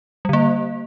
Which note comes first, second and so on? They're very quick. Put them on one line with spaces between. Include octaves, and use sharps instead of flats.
G3 D3 A#3